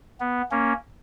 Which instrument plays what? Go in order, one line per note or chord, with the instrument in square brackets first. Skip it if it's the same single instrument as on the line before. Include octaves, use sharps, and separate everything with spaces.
[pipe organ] B3
A#3 C#4